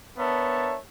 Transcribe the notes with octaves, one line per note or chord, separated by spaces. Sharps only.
B3 D4 A#4 C#5 E5 A5